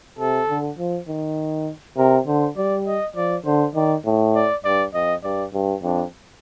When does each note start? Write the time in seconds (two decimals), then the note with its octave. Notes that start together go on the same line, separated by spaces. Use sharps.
0.19 C3 A4
0.49 D3
0.78 F3
1.08 D#3
1.97 C3 A#4
2.27 D3 C5
2.57 G3 D5
2.87 D#5
3.16 F3 D5
3.45 D3 C5
3.75 D#3 D5
4.05 A2
4.35 D5
4.64 G2 D5
4.94 F2 D#5
5.24 G2 D5
5.53 G2
5.83 F2 D4